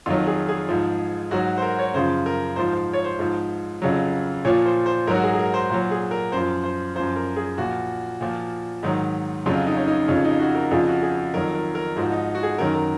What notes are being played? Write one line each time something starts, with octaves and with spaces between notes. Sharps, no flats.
F2 D#3 F#3 F4
G#4
G#4
G#2 F3
G#2 F#3 F#4
C5
A#4
C#5
F#2 C#3 F3 C5
A#4
G#2 F3 C5
C5
C#5
C5
G#2 F3
F2 C#3 F#3
A#2 F3 C#5
C5
C5
G#2 F#3 A#4
F#4
G#4
G#4
A#4
C5
A#2 F#3 C5
G#4
A#4
F#2 F3 C5
C5
F#2 F3 C5
A#4
G#4
A#2 F3 F#4
A#2 F3
G#2 D#3 F#3
F2 C#3 F#3 F4
D#4
C#4
D#4
F2 C#3 F3 C#4
D#4
F#4
A#4
F2 C#3 F3 G#4
F#4
G#4
F2 D#3 F#3 A#4
A#4
A#4
G#2 F3 F#4
D#4
F#4
G#4
F#2 D#3 F#3 A#4
A#4